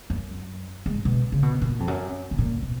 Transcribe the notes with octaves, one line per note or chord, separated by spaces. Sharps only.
F#2
G#2
B2
C#3
B2
A#2
F2
F#2
B2
A#2
B2